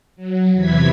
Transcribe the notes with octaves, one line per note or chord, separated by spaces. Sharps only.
F#3
E2 C3 E3 E4 G#6 B6